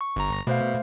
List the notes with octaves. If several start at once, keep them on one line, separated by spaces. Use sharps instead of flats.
C#6
G1 A#5
B2 A3 C5 F5